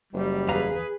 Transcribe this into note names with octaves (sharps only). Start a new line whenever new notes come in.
F#1 G3
E2 G#4 B4 F5 A#5